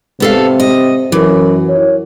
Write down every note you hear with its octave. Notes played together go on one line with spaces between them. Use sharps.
C3 B3 A4 F5
D#5
F#2 E3
C#5